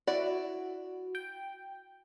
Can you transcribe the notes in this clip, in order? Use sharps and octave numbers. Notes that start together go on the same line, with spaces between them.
E4 F#4 D5
G5